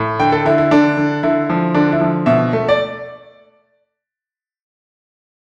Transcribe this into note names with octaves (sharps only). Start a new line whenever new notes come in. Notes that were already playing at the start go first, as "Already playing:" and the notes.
Already playing: A2
D3 G5
A4
D3 E4
E4
D3 D4
D3
D3 E4
F3
D3 D4
E4
F3
B2 E5
A3
D5